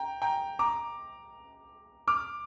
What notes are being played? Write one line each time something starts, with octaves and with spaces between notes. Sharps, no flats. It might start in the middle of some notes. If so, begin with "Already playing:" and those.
Already playing: G5 A#5
G5 A#5
A#5 D6
D6 F6